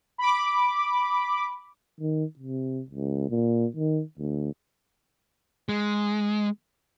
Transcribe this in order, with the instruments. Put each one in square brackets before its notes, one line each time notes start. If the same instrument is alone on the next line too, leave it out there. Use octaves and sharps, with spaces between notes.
[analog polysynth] B5 D6
[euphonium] D#3
C3
C#2
A#2
D#3
D2
[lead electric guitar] G#3